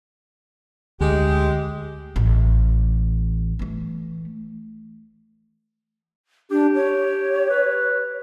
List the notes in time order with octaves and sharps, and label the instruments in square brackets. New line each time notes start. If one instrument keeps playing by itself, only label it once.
[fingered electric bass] D2 [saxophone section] G#3 G4
[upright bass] A1
E3 A3
[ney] D4 [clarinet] G4
[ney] C#5
[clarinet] B4